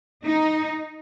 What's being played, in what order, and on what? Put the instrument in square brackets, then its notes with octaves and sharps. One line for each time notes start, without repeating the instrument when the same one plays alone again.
[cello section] D#4